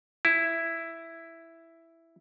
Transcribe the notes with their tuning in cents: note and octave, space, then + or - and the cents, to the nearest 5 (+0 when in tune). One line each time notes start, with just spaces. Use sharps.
E4 +5